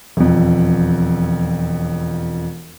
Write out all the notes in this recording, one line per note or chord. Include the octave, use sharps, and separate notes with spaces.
E1 F2